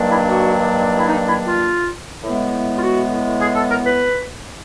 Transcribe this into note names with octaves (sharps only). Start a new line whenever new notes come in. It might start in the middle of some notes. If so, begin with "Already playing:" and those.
Already playing: G2 D#3 F#3 A#3 D4
E4
F#4
E4
D#4
E4
F4
A2 E3 G#3 B3
F4
F#4
G#4
A4
A#4
B4